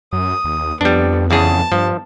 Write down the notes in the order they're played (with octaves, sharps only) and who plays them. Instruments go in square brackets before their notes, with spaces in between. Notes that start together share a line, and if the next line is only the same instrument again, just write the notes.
[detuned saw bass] F#2 [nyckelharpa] D#6
[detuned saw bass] D#2
[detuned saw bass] F2 [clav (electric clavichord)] G3 D4 [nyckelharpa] B3
[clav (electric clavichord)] E2 C#3 G#4 [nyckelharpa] A5
[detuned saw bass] G2 [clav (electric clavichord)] F3